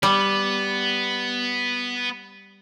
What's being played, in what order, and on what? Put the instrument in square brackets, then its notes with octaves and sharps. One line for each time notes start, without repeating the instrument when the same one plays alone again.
[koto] G3 [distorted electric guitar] B3